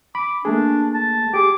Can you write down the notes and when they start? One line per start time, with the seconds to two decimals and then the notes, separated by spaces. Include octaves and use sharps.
0.15 B5 D6
0.45 A3 A#3 D4 G#4
0.94 A5
1.34 G4 G#4 D6